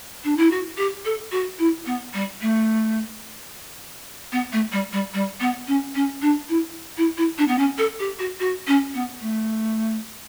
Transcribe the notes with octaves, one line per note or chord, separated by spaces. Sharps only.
D4
E4
F#4
G4
A4
F#4
E4
B3
G3
A3
B3
A3
G3
G3
G3
B3
C#4
C#4
D4
E4
E4
E4
D4
B3
C#4
A4
G4
F#4
F#4
C#4
B3
A3